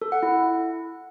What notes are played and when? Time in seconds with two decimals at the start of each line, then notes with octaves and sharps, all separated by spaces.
0.02 A4
0.12 F#5
0.23 E4